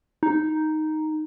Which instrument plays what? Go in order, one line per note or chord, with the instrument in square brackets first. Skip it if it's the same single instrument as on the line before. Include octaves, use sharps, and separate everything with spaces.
[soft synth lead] D#4